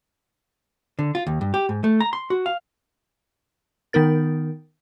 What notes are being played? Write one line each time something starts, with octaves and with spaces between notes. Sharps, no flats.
D3
F4
D#2
G2
G4
G#2
A3
A#5
C6
F#4
F5
D#3 B3 D#4 A#4 A6